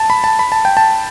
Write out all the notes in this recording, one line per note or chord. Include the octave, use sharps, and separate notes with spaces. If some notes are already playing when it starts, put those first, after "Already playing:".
Already playing: A5
B5
A5
B5
A5
G5
A5